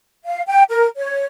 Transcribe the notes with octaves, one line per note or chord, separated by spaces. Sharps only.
F5
G5
A#4
C#5